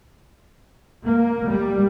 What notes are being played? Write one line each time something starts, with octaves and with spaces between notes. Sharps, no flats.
A#3
G3